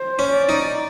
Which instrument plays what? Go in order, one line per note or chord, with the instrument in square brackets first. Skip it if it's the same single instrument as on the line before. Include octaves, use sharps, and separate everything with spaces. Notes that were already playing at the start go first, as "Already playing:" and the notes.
Already playing: [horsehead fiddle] C5
[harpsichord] C#4
[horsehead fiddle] D5
[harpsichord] D#4